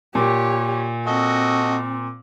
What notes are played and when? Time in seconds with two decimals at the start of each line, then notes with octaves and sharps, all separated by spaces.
0.15 A#2 G4 C#5
1.07 C4 F#4 A4 D#5